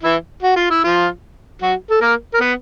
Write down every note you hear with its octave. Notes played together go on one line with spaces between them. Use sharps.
E3 E4
F#4
F4
E4
F3 F4
F#3 F#4
A4
A#3 A#4
A#4
B3 B4